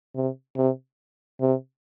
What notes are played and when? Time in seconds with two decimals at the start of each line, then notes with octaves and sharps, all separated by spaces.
0.15 C3
0.57 C3
1.41 C3